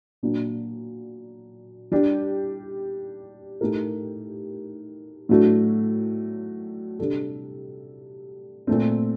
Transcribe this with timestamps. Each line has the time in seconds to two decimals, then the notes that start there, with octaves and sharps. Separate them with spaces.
0.23 A#2 F#3 A#3 D4
1.92 G3 D4 G4
3.61 A2 A3 D#4 G4 A#4
5.29 A2 F#3 A3 D4 F#4
6.99 C3 G3 D4 A4
8.67 A#2 A3 C4